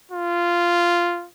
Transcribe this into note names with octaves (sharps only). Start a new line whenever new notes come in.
F4